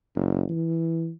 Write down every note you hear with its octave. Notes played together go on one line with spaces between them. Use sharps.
F#1
E3